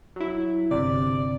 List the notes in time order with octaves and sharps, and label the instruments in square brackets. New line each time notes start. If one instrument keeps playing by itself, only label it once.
[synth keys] F#3 E4
[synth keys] G1 C3 [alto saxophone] D5